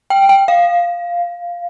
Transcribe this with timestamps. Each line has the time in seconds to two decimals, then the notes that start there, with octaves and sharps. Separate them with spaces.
0.10 G5
0.29 G5
0.48 F5